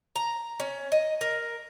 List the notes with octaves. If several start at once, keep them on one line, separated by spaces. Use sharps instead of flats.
A#5
C#4
D#5
A#4